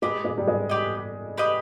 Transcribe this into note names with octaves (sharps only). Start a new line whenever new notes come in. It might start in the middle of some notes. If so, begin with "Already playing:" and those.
G#3 G4 B4 D#5
G#3
G3
G#3
G4 B4 D#5
G4 B4 D#5